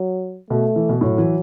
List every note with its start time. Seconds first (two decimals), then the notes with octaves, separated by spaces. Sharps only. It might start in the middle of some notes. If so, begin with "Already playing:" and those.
Already playing: F#3
0.50 B2 A3
0.76 E3
0.89 B2
1.01 A2 F#3
1.18 E3